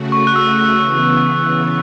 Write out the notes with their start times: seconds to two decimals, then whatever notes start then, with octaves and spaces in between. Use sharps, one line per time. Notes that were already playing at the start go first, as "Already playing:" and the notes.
Already playing: C#3 A3 F#4
0.12 C#6
0.27 F#6
0.36 E6
0.82 C#3 E3 B3